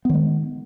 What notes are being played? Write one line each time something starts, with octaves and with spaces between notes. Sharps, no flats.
D#3 G#3 B3